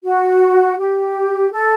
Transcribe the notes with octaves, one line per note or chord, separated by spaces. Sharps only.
F#4
G4
A4